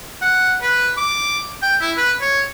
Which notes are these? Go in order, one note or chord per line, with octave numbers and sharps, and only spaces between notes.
F#5
B4
D6
G5
E4
B4
C#5